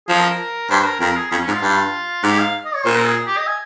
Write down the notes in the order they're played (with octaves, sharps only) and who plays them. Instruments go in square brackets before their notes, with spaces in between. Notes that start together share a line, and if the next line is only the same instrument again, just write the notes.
[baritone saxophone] F3 [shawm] G#4
[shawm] A#4
A#4
[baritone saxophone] G2 [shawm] C5
[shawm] A#4
[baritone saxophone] F2 [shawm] A#4
[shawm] G#4
[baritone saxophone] F2 [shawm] C#4
[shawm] C#4
[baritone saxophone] G#2
[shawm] F4
[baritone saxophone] G2
[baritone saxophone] G#2 [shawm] G4
[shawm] F5
D#5
C#5
[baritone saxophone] A#2 [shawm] C5
[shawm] A#4
G#4
G4
D#5
G#5